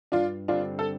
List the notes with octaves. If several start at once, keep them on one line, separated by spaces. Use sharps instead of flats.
G2 D4 F4
D3 G3 C4 D4 F4
A4